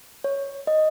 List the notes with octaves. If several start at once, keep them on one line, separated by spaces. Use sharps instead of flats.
C#5
D#5